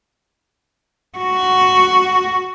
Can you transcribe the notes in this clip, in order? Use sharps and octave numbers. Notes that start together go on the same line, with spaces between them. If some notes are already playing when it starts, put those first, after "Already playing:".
F#4